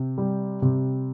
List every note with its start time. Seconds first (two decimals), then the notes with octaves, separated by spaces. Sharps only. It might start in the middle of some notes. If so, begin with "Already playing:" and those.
Already playing: C3
0.18 G3
0.62 C3